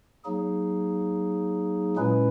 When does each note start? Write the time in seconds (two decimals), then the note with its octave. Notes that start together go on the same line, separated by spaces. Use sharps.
0.25 F#3 A#3 D#4 G#4
1.96 A#2 G#3 C#4 E4 B4